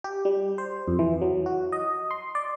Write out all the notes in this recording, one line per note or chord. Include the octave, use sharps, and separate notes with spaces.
G4
G3
C5
F2
E3
F#3
F#4
D#5
C6
D5